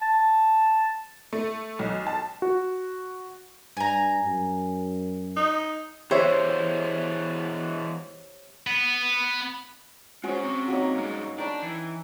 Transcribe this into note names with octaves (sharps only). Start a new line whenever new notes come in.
A5
A3
B1
A5
F#4
G2 G#5 A#5
F#2
D#4
E3 G#3 B3 G4 C5 C#5 E5
B3
G#3 C#4 F#4 C5
C4 A#5
F#3 A#3 D#4
G2 G#3
D4 G5 A#5 B5
E3